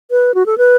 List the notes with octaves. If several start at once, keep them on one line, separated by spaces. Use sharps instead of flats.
B4
F#4
A4
B4